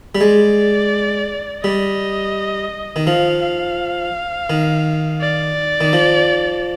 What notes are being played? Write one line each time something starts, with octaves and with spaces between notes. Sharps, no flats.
G3
G#3 D5
G3 D#5
D#3
F3 F5
F5
D#3
D5
D#3
F3